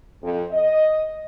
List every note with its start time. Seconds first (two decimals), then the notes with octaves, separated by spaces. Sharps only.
0.22 F2
0.52 D#5